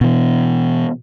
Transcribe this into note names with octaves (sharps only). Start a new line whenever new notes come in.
B2 E3